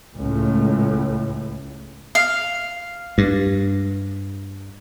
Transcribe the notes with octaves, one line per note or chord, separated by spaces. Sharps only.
C#2 A2
F5
G2